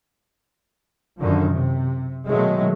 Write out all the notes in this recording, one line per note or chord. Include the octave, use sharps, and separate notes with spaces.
F#2 D3 D#3 F3
C3
B2 D#3 F#3 G#3 A3